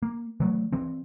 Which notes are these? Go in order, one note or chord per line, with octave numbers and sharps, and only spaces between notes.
A#3
E3 F#3 A3
E3 C4